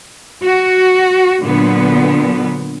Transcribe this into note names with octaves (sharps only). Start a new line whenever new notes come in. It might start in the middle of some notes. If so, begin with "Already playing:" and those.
F#4
A#2 D3 F#3 B3